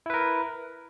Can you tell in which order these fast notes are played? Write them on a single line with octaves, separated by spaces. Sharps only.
E4 B4 A#4